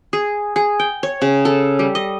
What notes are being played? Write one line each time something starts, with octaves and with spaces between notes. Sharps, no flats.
G#4
G#4
G5
C#5
C#3
A4
G3
D#5